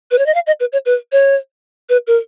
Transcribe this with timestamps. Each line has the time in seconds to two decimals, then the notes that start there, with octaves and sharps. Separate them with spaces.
0.11 B4
0.18 C#5
0.26 D#5
0.35 F5
0.47 D#5
0.60 B4
0.73 C#5
0.86 B4
1.12 C#5
1.89 B4
2.07 A#4